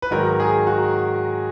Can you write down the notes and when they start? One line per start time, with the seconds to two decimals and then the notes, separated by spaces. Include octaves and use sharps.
0.02 B4
0.11 G#2 D#3 F#3 A#4
0.40 G#4
0.67 F#4